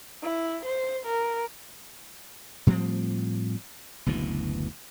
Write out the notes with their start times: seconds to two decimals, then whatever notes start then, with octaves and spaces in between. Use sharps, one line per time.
0.23 E4
0.65 C5
1.06 A#4
2.67 A2 F3 G3 C4
4.06 F#1 D2 B2 E3